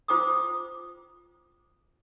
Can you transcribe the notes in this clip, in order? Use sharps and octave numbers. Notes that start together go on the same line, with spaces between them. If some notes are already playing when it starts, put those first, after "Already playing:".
F4 C5 G5 D6 D#6